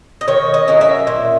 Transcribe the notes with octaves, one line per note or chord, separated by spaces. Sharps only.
D#5
D#3 C#5
D#5
F#3 A#3 C#4
E5
A#2